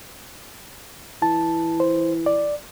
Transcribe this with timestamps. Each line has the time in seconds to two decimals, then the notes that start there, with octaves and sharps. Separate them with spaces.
1.22 E3 A5
1.80 C5
2.26 D5